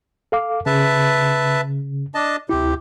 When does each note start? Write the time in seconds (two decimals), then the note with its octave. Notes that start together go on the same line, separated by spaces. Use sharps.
0.32 A4 F5 D6
0.66 C#3 B4 E5 A5
2.15 D4 D#5 A5
2.49 D2 C3 E4 G4